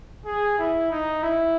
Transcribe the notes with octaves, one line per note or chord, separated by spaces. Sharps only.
G#4
E4
D#4
E4